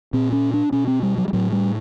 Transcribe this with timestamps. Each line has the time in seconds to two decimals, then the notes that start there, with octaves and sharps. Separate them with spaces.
0.13 A#2 C4
0.32 C#4
0.54 D4
0.72 B2 C#4
0.87 C4
1.03 G3
1.18 F#3
1.28 G3
1.33 A2 F#3
1.52 G3